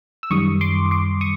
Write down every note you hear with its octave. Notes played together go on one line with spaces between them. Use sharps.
E6
F#2 D#3 G3 C#6 D#6
C6 D6
C6 D6
C#6 D#6